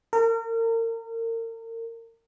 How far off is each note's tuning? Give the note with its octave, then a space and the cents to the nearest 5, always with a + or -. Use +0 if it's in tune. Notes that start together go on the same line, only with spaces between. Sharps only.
A#4 -35